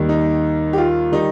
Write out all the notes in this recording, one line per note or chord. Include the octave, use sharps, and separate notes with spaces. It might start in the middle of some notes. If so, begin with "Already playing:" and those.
Already playing: D#2 D#3 G3
D#4
G4
F4
D#3 G3 D#4